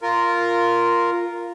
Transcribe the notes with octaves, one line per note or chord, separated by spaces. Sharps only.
F4 A#4